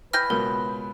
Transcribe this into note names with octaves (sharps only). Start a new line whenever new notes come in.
E3 B4 G5 B5 F6 A#6
C#2 B2 A#4